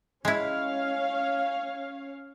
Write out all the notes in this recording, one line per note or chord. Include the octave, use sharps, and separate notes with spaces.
G#3 C#4 E4 C#5 F5